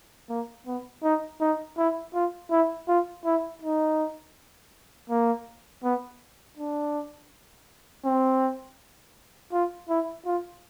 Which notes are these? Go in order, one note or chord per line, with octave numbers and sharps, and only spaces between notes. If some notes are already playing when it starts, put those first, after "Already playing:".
A#3
B3
D#4
D#4
E4
F4
E4
F4
E4
D#4
A#3
B3
D4
C4
F4
E4
F4